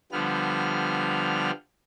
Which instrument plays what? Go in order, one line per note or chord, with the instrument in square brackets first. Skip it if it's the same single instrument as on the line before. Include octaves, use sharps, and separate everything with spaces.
[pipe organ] D3 F3 G3 B3 F6